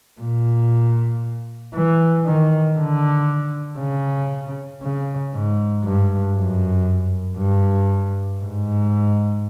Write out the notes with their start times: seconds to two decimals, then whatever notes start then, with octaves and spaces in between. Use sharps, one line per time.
0.21 A#2
1.74 E3
2.25 D#3
2.77 D3
3.79 C#3
4.82 C#3
5.33 G#2
5.84 G2
6.35 F#2
7.38 G2
8.41 G#2